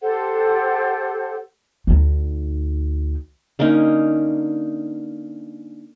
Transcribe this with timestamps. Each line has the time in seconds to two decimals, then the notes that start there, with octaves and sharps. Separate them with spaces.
0.01 G4 A4 C5 F#5
1.87 D2 D#4
3.59 D3 A#3 C#4 D#4